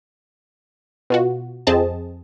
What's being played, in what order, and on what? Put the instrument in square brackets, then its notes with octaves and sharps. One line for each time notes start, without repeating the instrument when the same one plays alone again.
[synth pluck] B2 F4 F#4
F2 C4 G#4 D#5 A5